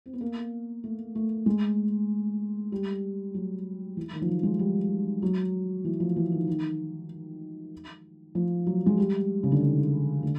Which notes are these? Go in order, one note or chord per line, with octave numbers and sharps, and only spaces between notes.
C4
B3
A#3
A3
A3
G#3
G3
F#3
E3
D#3
F3
F#3
G#3
G3
F#3
E3
F3
E3
D#3
D#3
F3
F#3
G#3
G3
C#3
D3
D#3
D3